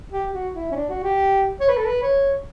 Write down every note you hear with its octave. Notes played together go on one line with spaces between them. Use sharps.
G4
F#4
E4
C#4
D4
F#4
G4
C#5
B4
A4
B4
C#5